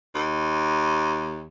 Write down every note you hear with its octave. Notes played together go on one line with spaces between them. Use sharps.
D#2